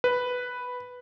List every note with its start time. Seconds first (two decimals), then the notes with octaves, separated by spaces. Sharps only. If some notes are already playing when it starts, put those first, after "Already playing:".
0.04 B4